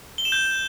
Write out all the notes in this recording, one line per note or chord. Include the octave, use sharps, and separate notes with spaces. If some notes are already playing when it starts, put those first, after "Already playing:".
G7
E7
G6